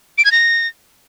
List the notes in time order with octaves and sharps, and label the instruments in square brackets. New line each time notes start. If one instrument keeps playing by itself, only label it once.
[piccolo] D7
G#6
A#6